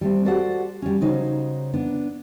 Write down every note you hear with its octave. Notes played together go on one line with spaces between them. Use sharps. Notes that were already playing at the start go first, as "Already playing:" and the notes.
G3 A3 C4
F#4 G4 A4 C5 D5 F#5
G3 C#4
C#3 F#3 D#4 C5
B3 D4